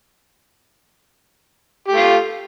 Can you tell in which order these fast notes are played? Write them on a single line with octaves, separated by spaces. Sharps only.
G4 A3 F4